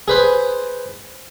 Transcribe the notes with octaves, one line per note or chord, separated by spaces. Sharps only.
G#4 B4 C5